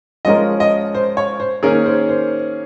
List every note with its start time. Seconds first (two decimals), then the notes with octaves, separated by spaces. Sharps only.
0.25 F3 G#3 C#4 F4 A#4 D#5
0.60 D#5
0.95 C5
1.17 C#5
1.40 C5
1.63 D#3 A#3 C#4 G#4 A#4
1.86 C5
2.09 C5